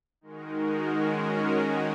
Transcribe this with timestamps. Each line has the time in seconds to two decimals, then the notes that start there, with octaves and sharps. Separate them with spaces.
0.21 D#3 G#3 D#4 F#4 A#4
0.94 D#3 G#3 C#4 F#4 A#4